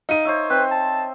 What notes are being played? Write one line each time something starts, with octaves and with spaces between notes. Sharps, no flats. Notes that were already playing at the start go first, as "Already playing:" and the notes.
D#4 F5 D#7
C5 C#5 E5
C4 B4
A5